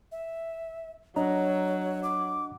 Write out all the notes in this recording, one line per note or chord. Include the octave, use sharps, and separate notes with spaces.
E5
F#3 D4 C#5 D#5 A#5
D6